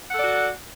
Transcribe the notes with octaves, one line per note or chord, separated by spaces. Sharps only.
F#4 A4 D5 F#5